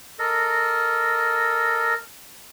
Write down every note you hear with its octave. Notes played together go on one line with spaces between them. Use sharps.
A4 A#4 D#5